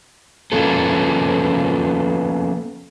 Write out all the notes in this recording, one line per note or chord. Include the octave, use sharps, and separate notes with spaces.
F3 A#3 B3 C#4 F4 A4